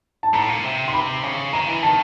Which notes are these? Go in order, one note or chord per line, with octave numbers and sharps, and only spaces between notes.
A5
A2 A#5
A#2
C3
C6
B5
C#3
D#3 A#5
E3
D#3 A5